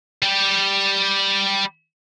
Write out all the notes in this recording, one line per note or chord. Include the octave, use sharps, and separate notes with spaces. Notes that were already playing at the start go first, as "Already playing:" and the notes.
G3 G4